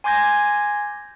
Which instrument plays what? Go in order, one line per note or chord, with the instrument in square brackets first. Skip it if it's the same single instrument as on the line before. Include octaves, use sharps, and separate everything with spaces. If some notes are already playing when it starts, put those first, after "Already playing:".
[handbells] G#5 C6 D6 G6 G#6 A#6